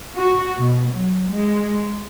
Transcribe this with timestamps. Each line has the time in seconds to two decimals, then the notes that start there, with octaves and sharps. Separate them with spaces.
0.18 F#4
0.59 B2
0.93 F#3
1.33 G#3